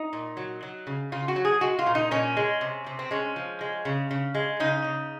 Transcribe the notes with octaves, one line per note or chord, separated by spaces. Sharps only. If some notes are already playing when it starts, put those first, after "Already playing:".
Already playing: D#4
A#2
F#3
F#3
C#3
C#3 F4
F#4
F#3
G#4
G#3 F#4
F4
A#2
D#4
A#2 C#4
G#3
C3
C3
C4
G#3 C#4
F3
G#3
C#3
C#3
G#3
C#3 D#4
C#3